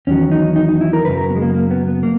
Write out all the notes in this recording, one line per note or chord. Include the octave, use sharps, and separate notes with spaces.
E2 D#3 F#3 C#4
D#4
D#4
D#4
E4
A#4
F#2 C#3 F#3 B4
A#4
B3
G#3
A#3
A#3
B3
B3
A#3